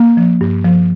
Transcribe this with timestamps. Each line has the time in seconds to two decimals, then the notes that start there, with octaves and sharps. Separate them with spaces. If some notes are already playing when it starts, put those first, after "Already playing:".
Already playing: A#3
0.17 F3
0.41 G2
0.64 F3